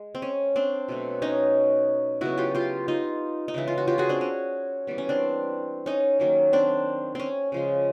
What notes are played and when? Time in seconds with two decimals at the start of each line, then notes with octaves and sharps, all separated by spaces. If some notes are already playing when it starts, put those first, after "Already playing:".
Already playing: G#3
0.15 C4
0.22 C#4
0.56 C4 D4
0.89 B2 F#3 A3
1.22 C#4 D#4
2.21 C#3 F#3 B3 E4 F#4
2.38 F4 G4
2.55 F4 G4
2.88 D#4 F4
3.48 D#4
3.54 C#3 E3 G#3 E4
3.68 F4
3.78 F#4
3.88 F4 G4
3.98 F#4 G#4
4.09 C4 D4
4.21 C#4
4.87 E3 G3 B3
4.98 C#4
5.09 C4 D4
5.86 C#4 D#4
6.20 D#3 F#3 A#3
6.53 C4 D4
7.15 C4 C#4
7.52 C#3 F3 G#3